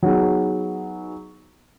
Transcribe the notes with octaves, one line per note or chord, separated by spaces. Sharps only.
F#3 B3 D#4 G#4